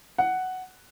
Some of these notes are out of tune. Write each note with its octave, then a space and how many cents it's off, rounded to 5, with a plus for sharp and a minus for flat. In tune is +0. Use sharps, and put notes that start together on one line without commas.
F#5 +5